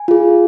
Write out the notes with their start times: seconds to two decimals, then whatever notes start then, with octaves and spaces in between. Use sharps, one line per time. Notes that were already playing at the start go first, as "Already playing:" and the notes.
Already playing: G#5
0.08 F4 G#4